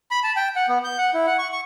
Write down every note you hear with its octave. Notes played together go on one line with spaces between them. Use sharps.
B5
A5
G5
F#5
B3
G6
F#5
E4
F#5
C#6
C#6